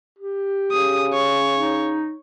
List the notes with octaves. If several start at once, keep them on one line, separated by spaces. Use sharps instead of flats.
G4
C#3 D#6
C#5
D#4